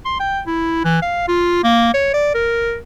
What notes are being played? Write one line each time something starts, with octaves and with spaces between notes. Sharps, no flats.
C6
G5
E4
E3
F5
F4
A#3
C#5
D5
A#4